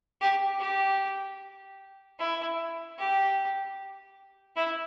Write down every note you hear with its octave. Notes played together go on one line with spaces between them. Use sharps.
G4
G4
E4
G4
E4